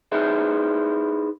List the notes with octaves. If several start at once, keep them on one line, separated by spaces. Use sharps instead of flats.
D#4 E4 G#4 B4 E5